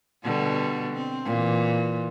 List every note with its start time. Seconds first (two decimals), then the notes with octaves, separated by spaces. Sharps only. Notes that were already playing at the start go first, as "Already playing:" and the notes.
0.24 B2 D3 G3
0.94 C4
1.25 A#2 E3